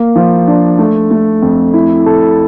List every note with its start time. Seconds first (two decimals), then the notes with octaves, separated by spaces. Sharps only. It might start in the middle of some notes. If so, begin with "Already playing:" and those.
Already playing: A#3
0.16 F3
0.47 D4
0.79 A3
1.11 A3
1.42 F2
1.73 E4
2.06 A4